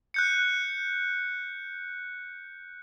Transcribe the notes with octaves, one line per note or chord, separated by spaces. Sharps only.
F#6 G6 C#7